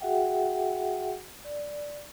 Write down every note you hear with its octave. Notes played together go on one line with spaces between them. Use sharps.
F#4 G#4 E5 F#5 G5
D5